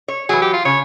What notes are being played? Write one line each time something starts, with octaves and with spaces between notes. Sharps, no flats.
C#5
E3 F#3 G#4
G4
F4
C#3 C#5